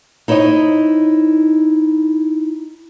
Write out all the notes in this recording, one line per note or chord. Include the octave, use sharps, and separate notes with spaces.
D#4 E4 C5 C#5 D#5